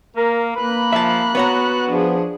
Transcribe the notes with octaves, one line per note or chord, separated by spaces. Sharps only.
A#3 A#4
A#3 B4 B5 F#6
F3 E5 A5
B3 F#4 C#5 A#5
F3 D4 G#4